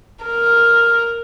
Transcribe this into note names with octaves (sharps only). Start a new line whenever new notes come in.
A#4